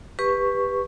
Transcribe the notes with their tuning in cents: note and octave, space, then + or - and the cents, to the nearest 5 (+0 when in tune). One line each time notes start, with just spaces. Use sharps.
G4 +20 B4 +0 C#6 +0